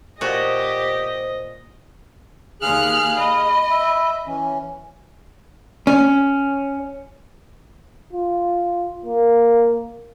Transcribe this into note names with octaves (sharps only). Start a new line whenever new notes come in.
A#2 F#4 G4 C5 D#5
D#2 G#4 F5 F6 F#6
D#5 B5
E5
E3 C#4
C#4
F4
A#3